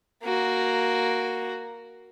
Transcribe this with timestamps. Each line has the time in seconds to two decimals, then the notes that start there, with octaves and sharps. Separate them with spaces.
0.23 A#3 F#4